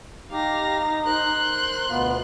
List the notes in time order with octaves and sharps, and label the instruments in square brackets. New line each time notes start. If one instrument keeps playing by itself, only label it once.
[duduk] D#4 [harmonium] G4 [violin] F5 A#6
[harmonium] A#4 C5 [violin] C6 F#6
[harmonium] D2 B2 F4 [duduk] B3